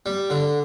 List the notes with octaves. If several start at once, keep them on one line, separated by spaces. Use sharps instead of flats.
G3
D3